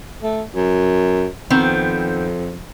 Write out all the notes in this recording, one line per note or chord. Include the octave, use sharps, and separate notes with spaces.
A3
F#2
F2 D#3 B3 C4